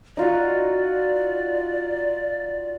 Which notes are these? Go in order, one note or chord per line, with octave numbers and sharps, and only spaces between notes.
D#4 F4 F#4 D5